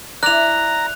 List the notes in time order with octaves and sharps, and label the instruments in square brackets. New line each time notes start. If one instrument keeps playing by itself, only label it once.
[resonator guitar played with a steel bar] E4 D5 [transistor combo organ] A#5 [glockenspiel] F#6 F7